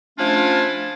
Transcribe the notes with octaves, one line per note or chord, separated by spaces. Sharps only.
F3 A3 C#4 D4 E4 F4